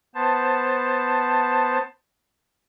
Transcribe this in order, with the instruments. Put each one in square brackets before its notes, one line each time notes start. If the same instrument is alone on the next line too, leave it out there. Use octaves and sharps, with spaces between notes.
[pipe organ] B3 C5 A5